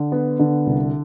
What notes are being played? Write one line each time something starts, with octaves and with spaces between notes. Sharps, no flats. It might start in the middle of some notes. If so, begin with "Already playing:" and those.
Already playing: D3
B3
D3
C2